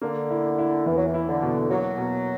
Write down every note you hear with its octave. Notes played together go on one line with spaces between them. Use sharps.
D3 A#3
E4
E4
E2 E3
F#3
E3
E4
D3
B2
F#3 A#3
B2